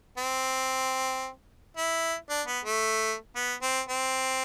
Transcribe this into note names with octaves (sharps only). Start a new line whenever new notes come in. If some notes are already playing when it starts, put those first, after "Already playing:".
C4
E4
D4
B3
A3
B3
C4
C4